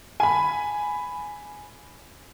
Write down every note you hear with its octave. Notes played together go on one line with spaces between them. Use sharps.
G#5 B5